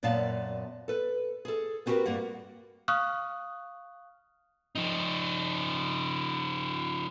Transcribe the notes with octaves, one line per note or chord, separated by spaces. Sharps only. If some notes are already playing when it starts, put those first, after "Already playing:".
F#2 A#2 B3 D5 F5 A5
A4 B4
G#4 A4
B3 C4 F#4 G4 A#4 B4
G2 G3 A#3 F#5
F5 C#6 D#6 F6 F#6
F3 D#4